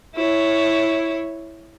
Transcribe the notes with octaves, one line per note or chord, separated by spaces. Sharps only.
E4 C#5